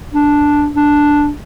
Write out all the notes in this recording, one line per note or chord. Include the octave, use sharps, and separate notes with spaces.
D4
D4